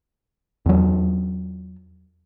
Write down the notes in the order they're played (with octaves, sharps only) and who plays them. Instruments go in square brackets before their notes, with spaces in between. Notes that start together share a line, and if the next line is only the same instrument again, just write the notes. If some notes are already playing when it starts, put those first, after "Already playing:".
[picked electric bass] E2 F#3